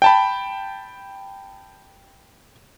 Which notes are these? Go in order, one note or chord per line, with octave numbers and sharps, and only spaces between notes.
G5 A5 B5